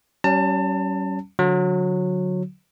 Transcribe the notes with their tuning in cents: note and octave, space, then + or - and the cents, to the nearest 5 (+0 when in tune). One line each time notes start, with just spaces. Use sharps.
G3 -45 C#4 +0 A5 +30
D3 -20 F#3 -20